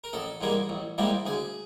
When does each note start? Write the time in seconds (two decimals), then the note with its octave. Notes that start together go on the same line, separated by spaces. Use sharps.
0.04 A#4
0.13 A1 A4
0.41 G#2 E3 G3 A#3
0.69 A1
0.98 G#2 E3 G3 A#3
1.26 D2 G#4